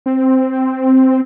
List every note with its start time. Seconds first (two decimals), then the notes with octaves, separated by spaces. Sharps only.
0.06 C4